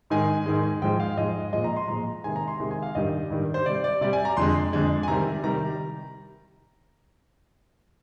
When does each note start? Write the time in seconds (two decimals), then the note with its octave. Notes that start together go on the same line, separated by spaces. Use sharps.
0.10 G#2 D#3 G#3 G#5
0.46 G#2 D#3 G#3
0.82 G#2 F3 G#3 G5
1.00 F5
1.17 G#2 F3 G#3 D#5
1.52 A#2 F3 G#3 D#5
1.64 A#5
1.76 C6
1.88 A#2 F3 G#3 A#5
2.24 C3 D#3 G#3 G#5
2.36 A#5
2.48 C6
2.60 C3 D#3 G#3
2.71 G#5
2.83 F5
2.95 G2 D#3 G3 D#5
3.30 G2 D#3 G3
3.54 C5
3.66 C3 G3 D5
3.84 D5
4.01 C3 G3 D5
4.13 G#5
4.25 A#5
4.37 F2 D3 G#3 C6
4.73 F2 D3 G#3
5.03 G#5
5.08 C3 D#3 G3 A#5
5.43 C3 D#3 G3 A#5